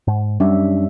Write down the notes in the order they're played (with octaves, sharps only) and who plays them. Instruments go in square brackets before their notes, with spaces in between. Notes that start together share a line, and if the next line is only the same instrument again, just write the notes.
[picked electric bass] G#2
[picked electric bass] F#2 C#4 D4 [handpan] G3 E5